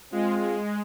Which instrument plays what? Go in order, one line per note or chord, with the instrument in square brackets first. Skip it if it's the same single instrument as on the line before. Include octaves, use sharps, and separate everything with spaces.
[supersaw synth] G#3 [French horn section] C4 F4